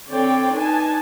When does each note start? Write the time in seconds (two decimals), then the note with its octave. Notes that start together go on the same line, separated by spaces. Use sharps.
0.10 D3 C4 C#5 D5 G5
0.54 D4 D#4 B4 G#5 A5